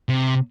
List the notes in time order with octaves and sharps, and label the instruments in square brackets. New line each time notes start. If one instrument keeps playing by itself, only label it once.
[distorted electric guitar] C3